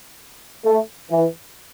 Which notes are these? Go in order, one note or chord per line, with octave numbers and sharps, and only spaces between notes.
A3
E3